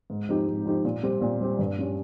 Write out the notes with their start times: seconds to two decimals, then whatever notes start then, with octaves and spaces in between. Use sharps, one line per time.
0.10 G#2
0.29 F3 C4 D#4 G4
0.48 G#2
0.66 F3 C4 D#4 G4
0.85 A#2
1.03 G3 C4 G4
1.22 A#2
1.40 G3 C4 G4
1.59 G2
1.78 G3 C#4 G4